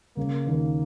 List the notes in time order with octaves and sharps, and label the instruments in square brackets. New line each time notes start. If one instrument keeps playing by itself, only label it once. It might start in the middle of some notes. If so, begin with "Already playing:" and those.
[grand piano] C#3 [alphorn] A#3
[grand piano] D#2